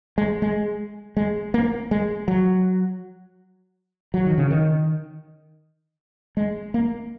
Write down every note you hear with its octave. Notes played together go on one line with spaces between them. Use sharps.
G#3
G#3
G#3
A#3
G#3
F#3
F#3
D#3
C#3
D#3
G#3
A#3